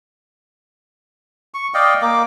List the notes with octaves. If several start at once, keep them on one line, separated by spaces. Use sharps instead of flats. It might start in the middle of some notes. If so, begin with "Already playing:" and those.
C#6
D5 D#5 F5 G5
A#3 D6